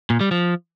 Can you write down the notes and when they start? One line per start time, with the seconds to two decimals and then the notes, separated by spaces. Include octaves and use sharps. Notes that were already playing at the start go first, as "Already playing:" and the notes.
0.10 A#2
0.21 G3
0.31 F3